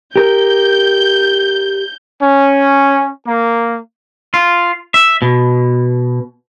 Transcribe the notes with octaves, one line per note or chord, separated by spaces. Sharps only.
G4 A#4 G6
C#4
A#3
F4
E5
B2